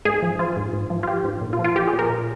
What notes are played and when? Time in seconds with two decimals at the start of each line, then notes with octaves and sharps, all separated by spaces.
0.05 G#2 G#4
0.22 F3
0.39 F3 F4
0.57 G#2
0.73 G#2
0.90 F3
1.03 F4
1.07 F3 G4
1.24 G#2
1.41 A#2
1.53 F4
1.59 F3
1.64 F4
1.76 F3 G4
1.87 G#4
1.93 A#2
1.99 A#4
2.10 A#2